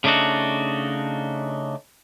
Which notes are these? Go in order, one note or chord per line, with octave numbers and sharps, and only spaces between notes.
C#3 A3 D4 D#4 F#4